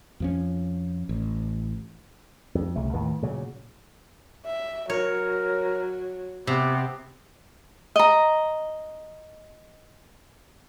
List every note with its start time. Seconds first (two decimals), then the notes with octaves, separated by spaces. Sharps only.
0.20 F2 F3 C#4
1.09 A1
2.55 F2
2.76 C2 C#3 A3
2.93 D#2 A2 D#3 E3
3.22 A#2 C#3 F#3
4.45 E5
4.90 F#3 A#4 C#5
6.47 C3 B3 G4
7.96 D#5 A#5